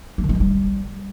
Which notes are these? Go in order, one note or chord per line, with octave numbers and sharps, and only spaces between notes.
A#3
D#3
G3
G#3
G3